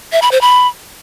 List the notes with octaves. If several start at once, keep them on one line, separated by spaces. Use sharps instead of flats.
E5
B5
C5
B5